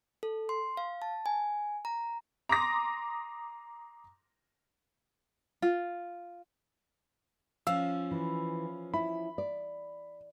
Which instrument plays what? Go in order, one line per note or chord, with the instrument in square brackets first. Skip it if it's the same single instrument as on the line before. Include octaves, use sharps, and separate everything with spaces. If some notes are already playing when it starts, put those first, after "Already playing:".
[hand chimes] A4
C6
F5
A5
G#5
A#5
[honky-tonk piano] A#5 C6 D6 D#6 A#6
[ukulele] F4
[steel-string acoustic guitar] F3 C#4 [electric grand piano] F5 E6
[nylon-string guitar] E3
[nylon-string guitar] E4 [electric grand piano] B5
[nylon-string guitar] D5